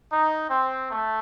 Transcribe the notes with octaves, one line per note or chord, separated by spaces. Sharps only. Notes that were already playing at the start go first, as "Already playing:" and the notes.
D#4
C4
A3